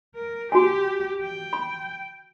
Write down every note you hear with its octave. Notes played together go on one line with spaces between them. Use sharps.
A#4
F#4 G4 G#5
G5
B5